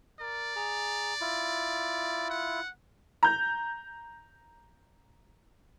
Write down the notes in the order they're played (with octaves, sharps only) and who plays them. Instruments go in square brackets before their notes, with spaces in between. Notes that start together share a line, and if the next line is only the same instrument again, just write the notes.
[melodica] A#4 [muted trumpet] D5
[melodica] G#4 A#5
E4 F4
[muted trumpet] F#5
[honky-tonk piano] A#5 G6